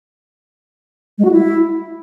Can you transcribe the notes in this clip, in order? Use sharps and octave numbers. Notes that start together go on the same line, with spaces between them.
G#3
F#4
E4